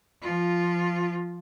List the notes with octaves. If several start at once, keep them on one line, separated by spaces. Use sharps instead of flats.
F3 F4